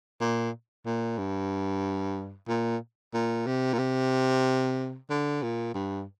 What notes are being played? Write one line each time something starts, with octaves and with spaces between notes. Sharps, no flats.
A#2
A#2
G2
A#2
A#2
C3
A#2
C3
D3
A#2
G2